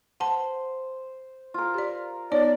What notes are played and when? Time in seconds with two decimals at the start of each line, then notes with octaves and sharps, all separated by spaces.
0.20 C5 F#5 A5
1.54 F4 A#4
1.74 G4 D5
2.32 B3 D#4 C#5 D5